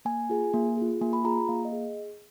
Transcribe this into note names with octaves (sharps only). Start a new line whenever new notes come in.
A#3 G#5
F4 G#4
A#3
F4 G#4
A#3 G#5
B5
F4 G#4 A#5
A#3 F5
D#5
G#4